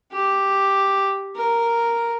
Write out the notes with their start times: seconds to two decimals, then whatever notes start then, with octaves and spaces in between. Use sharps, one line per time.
0.13 G4
1.36 A#4